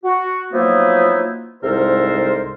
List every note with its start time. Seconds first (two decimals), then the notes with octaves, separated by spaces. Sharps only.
0.04 F#4
0.52 F3 F#3 A#3 B3 D#4 E4
1.62 C2 G#2 A4 A#4 C5